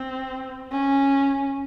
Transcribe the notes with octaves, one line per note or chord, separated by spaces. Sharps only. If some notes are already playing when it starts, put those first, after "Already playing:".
Already playing: C4
C#4